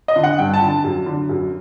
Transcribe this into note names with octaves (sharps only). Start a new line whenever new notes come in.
D#5
D3
F#5
G2 G5
A5
D3
A5
F#2
D3
F#2